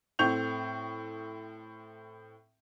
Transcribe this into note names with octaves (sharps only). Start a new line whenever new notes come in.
A2 C4 C#6 G6 F7